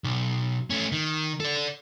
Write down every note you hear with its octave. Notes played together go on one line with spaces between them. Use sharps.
B1
A3 C#4
D#3
A4 D5